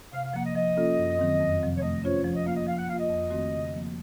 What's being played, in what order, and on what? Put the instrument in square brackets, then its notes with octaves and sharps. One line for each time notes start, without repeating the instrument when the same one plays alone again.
[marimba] C3 [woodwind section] F5
[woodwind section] F5
[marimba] F3 A#3 [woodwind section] F#5
[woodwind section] D#5
[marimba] F3 [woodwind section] D#5
[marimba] A#3 C#4 F4 A4
F#2
D#3 F#3 C4
F2
C3 F3 C4
[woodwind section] C#5
[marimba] A3 [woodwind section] D#5
[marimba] C#4 F4 C5 [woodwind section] C#5
[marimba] F3 [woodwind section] C#5
[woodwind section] D#5
[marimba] A#3 F4 [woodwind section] F5
[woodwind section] D#5
[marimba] F3 [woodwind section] F5
[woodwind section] F#5
[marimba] A#3 F4 [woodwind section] F5
[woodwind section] D#5
[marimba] F2
D#3 A3 C4 F#4
C#3
F3 A#3